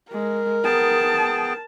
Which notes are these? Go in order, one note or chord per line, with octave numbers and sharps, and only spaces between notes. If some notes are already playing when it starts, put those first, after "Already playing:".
G#3 A#4
B3 G#4 G5 A5